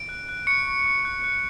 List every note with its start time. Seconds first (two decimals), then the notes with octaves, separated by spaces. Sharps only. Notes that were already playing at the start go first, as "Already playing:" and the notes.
Already playing: D7
0.09 F#6
0.29 F#6
0.47 C#6 C#7
0.67 C#6
0.86 C#6
1.05 F#6
1.24 F#6